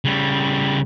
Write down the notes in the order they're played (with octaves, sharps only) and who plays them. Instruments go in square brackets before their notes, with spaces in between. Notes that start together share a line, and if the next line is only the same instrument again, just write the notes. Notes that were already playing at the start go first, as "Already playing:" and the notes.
[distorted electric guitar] C#3 G3